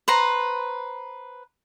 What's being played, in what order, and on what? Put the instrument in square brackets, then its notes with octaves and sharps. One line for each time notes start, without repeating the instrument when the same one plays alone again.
[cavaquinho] B4 C5 A#5